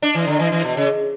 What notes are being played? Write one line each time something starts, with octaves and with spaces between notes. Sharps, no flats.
D4
E3
D3
E3
E3
B2
C#3